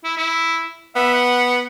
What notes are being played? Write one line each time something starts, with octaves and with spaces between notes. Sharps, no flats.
E4
E4
B3 E5
F#5